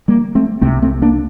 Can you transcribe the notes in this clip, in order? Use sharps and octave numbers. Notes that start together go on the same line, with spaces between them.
G3 A#3
A3 C4
C2 C3 A3 C4
A3 C4
A#3 D4